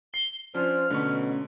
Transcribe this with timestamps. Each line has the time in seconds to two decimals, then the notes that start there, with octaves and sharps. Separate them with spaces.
0.14 C7 G7
0.55 F3 C#4 D4 F4 C5 F6
0.90 B2 D3 A3 C#4 C#6